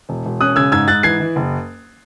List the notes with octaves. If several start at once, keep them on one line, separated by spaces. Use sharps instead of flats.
E1
E1
C#4 D#6 F#6
C#3 E6 G#6
G#2 E6 G#6
G#2 F#6 A6
E3 G#6 C7
E3
F#1